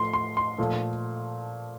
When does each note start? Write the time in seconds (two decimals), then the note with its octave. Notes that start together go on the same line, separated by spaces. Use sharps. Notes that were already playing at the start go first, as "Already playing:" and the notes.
Already playing: A2 F3 A3 C6
0.13 C6
0.37 C6
0.58 A#2 F3 A3